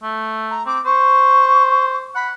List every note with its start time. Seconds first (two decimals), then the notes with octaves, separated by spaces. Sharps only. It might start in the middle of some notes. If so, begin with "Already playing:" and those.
0.03 A3
0.50 A#5
0.66 C4 D6
0.86 C5 C#6
2.15 F#5 B5